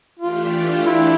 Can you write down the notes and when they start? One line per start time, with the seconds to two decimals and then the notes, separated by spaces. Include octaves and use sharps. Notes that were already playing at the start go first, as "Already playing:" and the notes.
0.20 E3 A3 D4 F4 G4
0.86 E4